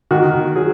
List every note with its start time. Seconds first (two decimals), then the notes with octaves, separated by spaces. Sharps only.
0.11 D#3 F#4
0.56 F#3 G#4